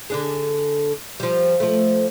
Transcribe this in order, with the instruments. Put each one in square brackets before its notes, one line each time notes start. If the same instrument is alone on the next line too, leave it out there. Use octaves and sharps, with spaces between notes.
[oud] D3 D4 G#4
F3 G3
F3 A3